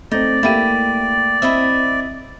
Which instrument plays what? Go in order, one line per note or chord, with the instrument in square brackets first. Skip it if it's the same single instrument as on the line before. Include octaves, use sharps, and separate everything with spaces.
[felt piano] A3 C4 [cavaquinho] D#4 [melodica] D5
[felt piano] A3 A#3 D#7 [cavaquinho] E4 G4
[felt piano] C4 [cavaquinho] E4 D#5 E5